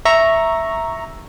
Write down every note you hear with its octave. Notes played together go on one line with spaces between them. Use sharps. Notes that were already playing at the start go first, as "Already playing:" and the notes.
E5 A#5 C#6